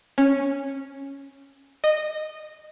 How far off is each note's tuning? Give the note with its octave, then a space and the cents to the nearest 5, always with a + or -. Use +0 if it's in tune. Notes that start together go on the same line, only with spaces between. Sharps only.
C#4 -5
D#5 -15